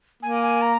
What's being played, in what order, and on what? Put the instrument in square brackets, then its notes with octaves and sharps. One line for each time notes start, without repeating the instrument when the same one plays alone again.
[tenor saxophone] A#3 [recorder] G#5
[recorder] G#5
A#5